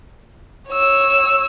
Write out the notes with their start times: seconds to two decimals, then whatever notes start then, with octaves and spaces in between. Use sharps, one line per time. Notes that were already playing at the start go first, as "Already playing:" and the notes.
0.69 C#5 E6